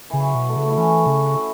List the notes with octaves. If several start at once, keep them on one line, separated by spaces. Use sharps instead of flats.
C#3 E3
F#3
B2
A3
C#3
F#4
E4
E3 C#4
C#3 F#4
F#4
E4